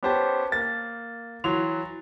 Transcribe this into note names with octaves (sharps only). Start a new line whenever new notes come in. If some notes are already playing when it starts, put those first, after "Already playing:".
B3 C#4 G4 C5 G5 A5
A#3 A6
E3 F#3 C6 F7